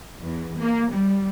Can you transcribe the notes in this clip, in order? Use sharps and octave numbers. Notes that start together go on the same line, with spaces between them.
E2
A#3
G3